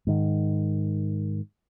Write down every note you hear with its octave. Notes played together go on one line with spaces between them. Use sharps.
G#2 D#3